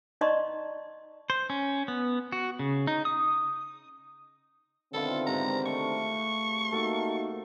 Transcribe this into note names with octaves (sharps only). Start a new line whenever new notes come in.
D#4 D5 D#5 A#5 C6 C#6
C5
C#4
B3
F#4
C#3
D#4
D#6
B2 D3 D#3 C4 E4 F4 A4
G#2 C3 A#5
A3 C#6
A3 A#3 D#4 F#4 A4 A#4